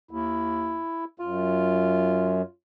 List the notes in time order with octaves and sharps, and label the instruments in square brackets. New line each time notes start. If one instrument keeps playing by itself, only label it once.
[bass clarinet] D#2 [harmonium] E4
[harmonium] F#2 [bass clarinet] F4